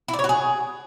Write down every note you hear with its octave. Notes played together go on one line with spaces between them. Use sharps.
E4
D5
C#5
F#4
G#4